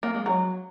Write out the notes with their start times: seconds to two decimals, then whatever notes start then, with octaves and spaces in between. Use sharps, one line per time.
0.03 A#3
0.14 G#3
0.26 F#3